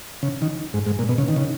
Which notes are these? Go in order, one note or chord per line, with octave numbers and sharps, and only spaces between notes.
C#3
D#3
G#2
G#2
A#2
B2
C#3
D#3
C#3